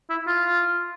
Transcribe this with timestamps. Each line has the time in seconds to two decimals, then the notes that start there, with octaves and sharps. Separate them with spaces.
0.10 E4
0.27 F4